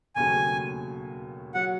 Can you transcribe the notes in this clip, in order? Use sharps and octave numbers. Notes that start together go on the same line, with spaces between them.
E1 D#2 C#3 F#3 A3 G#5
F#3 F#5